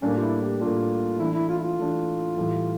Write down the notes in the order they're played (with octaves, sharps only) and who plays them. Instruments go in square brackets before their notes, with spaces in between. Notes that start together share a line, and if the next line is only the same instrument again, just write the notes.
[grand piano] A2 G3 A#3 D4 [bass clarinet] C#4
[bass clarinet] F4
E4
G4
[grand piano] A2 G3 A#3 D4 [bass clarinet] F4
[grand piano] E3 A3 D4 [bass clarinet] E4
[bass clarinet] E4
F4
E4
F4
[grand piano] E3 A3 D4
A2 E3 G3